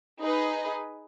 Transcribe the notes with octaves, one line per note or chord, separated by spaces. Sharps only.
D#4 G#4 B4 D#5